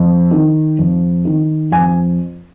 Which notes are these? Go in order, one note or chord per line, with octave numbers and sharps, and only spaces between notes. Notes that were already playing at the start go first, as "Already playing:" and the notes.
Already playing: F2
D#3
F2
D#3
F2 G#5